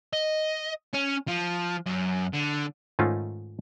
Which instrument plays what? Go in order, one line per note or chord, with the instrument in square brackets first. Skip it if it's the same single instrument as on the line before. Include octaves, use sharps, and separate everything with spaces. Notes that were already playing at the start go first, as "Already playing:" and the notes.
[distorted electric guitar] D#5
C#4
F3
F#2
D3
[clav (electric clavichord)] G#2 D#3 A3 C#4 D#4 F4